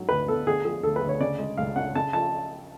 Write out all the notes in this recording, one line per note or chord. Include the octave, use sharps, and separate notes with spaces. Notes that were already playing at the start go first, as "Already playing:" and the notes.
Already playing: G#2 F#3
D2 B4
B3 A4
D3 G#4
F3 G#4
D2 A4
B4
D2
C#5
C#3 D5
G#3
C#2 F5
C#4 F#5
C#3 A5
F3 A5